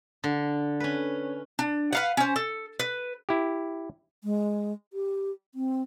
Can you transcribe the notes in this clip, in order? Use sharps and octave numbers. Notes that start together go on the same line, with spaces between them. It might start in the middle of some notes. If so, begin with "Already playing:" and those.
D3
C#4 B4
D4
B4 F5 F#5
C#4 C5
A4
B4
E4 G4
G#3
G4
C4